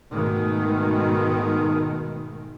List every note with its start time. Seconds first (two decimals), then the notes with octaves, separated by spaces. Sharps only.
0.12 G#2 B2 D#3 G#3 A3